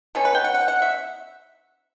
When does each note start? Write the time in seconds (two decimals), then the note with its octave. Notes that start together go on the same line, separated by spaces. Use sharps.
0.15 B2 F#3 C#4 A4
0.25 B4
0.35 G5
0.44 F#5
0.54 F#5
0.68 F#5
0.82 E5